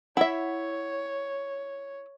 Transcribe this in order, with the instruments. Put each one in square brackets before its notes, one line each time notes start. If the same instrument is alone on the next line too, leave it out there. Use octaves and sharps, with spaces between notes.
[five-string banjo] E4 E5 [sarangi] C#5 [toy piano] F#5